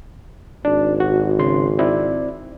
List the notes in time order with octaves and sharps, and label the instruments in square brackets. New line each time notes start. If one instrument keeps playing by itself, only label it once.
[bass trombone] G#1 [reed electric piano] D4
[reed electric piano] F#4
C#3 C6
C4 E4 D5